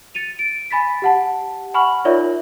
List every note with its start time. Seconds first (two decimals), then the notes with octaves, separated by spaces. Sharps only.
0.15 A6 C#7 D#7 F7
0.39 D7
0.71 G#5 B5 A6 B6
1.02 G4 F#5 A5
1.74 F#5 G#5 B5 C#6 F6 F#7
2.05 D#4 F4 A#4 C#5 D5 E5